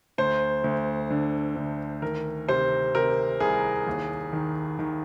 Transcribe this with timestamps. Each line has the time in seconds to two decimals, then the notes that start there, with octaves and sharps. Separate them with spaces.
0.18 D2 C5
0.64 D2
1.10 D3
1.56 D2
2.02 D#3 A#4
2.48 C3 C5
2.94 C3 A#4
3.40 C2 G#4
3.87 D#2
4.33 D#3
4.79 D#3